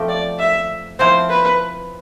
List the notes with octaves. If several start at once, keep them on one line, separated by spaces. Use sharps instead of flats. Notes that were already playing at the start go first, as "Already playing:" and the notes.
Already playing: F3 A3 C4 G4
D5
E5
F3 C4 E4 C5
B4